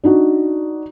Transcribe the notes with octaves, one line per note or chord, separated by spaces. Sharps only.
D4 D#4 F#4